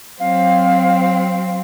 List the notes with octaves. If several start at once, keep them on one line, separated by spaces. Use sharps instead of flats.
F#3 C4 F5